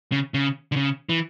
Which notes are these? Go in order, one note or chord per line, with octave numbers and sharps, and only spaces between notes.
C#3
C#3
D3
C#3
E3